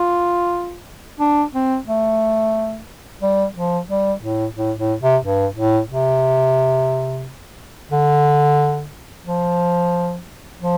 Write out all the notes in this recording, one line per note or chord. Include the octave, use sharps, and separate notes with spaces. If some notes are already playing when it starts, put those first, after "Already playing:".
Already playing: F4
D4
C4
A3
G3
F3
G3
A2
A2
A2
C3
G2
A2
C3
D3
F3
F3